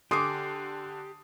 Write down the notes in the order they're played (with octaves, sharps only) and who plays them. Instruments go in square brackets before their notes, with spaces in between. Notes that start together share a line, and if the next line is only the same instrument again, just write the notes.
[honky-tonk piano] D3 [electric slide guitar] G4 [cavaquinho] G#5 D6 [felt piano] C6 D#6 C7